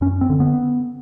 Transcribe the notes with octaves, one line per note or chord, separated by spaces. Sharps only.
F#2 C#4
C4
D3
B3